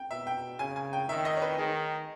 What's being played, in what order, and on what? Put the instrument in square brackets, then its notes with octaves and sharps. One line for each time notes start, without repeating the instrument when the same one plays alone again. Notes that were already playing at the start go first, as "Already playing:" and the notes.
Already playing: [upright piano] G5
[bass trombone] B2 [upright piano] E5
[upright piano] G5
[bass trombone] C#3 [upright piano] G#5
[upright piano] G#5
G5
[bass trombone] D#3 [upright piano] E5
[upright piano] D#5
C#5
B4
[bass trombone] D#3 [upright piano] G#4